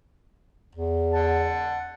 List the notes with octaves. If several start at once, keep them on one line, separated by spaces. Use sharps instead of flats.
E2
F#5 A5